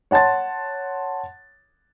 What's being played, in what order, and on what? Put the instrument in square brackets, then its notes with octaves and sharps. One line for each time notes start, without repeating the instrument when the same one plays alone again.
[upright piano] C#5 F#5 A5 C6 A6